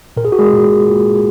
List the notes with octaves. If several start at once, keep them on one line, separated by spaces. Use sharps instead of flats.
A#2 A#4
G#4
F#4
G#3 G#4
A#2
A#2